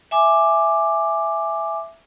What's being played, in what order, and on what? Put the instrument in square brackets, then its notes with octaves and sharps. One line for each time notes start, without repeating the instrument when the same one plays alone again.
[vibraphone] E5 G#5 D6